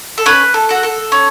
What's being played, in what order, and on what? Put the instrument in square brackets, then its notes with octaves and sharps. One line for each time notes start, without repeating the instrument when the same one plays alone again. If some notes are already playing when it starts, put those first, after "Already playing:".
[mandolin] A4
C#4 B4
A4
F#4 A4
A4
C#4